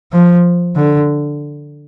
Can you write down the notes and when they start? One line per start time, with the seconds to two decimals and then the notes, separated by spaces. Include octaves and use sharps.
0.13 F3
0.76 D3